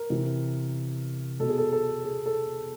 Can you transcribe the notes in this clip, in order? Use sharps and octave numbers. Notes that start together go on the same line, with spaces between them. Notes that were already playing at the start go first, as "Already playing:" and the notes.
Already playing: A#4
C3 E3
B2 A4
G#4
A4
A4
G#4
A4